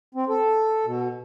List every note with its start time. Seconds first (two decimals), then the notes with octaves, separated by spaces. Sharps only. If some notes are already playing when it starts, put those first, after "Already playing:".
0.15 C4
0.29 A4
0.85 B2